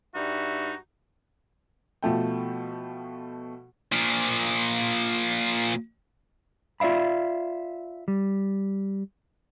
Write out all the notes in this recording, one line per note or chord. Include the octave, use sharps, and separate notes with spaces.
G2 G3 D#4 F#4 E5
B2 F3 A3 G5
A#2 F3
F4 D5 E5 F5 B5
G3